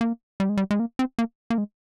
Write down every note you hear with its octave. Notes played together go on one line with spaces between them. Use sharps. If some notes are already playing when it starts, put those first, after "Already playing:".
A#3
G3
G#3
G3
G#3
A#3
C4
A#3
A#3
G#3